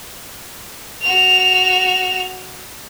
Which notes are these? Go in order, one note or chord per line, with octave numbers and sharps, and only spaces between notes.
F#4 F7